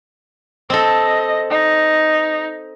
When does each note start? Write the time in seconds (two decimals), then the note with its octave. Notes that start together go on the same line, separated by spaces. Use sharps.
0.70 C4 A4 D#5
1.50 D#4